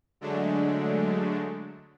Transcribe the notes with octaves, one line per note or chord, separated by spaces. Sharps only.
D3 F#3 G#3 A3 D4